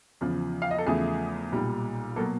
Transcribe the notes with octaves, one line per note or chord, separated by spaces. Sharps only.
E2 C#3 F3
F5
D#5
A4
E2 C#3 F3 A3 G#4
B1 A#2 G3
B2 F#3 A#3 A4